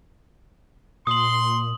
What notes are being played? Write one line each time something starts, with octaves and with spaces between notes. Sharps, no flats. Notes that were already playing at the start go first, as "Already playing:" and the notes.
A#2 C6 D#6 F#7